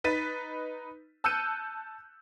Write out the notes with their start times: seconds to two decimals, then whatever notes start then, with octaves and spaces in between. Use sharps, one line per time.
0.04 D#4 B4 A6 B6 D#7
1.24 A5 E6 F#6 G6 C#7 D#7